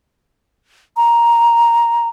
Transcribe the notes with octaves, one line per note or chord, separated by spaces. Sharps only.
A#5